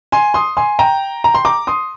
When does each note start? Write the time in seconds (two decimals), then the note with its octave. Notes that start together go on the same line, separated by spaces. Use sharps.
0.12 G#5 C6
0.34 C6 D#6
0.57 G#5 C6
0.79 G5 A#5
1.24 A#5
1.34 C6
1.45 A#5 D6
1.67 C6 D#6